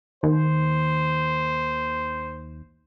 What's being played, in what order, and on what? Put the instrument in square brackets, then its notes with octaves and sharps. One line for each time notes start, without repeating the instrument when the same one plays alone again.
[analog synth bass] D#2 [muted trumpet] C5